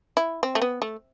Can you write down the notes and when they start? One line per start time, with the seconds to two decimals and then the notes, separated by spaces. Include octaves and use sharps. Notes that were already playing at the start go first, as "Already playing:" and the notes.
0.17 E4
0.43 C4
0.55 A3
0.62 B3
0.82 A3